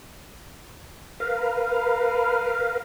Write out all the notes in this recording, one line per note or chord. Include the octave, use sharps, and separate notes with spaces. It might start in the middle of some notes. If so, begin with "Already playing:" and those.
A#4 B4 F5